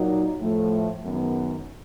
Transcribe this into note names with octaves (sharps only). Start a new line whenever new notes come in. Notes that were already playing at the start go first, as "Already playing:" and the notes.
Already playing: A#2 F#3 A#3 D#4 F#4
A2 F3 A3
F#2 D#3 G#3 B3